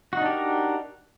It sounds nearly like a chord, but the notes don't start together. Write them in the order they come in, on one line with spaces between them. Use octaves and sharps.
F#4 D#4 D4 G4 A#4